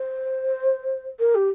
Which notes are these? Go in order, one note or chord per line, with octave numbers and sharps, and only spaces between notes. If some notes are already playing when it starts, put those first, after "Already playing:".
Already playing: C5
A#4
G4